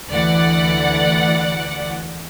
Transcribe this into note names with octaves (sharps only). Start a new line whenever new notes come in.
D2 E3 D5 F#5